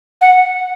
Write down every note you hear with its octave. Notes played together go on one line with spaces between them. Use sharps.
F#5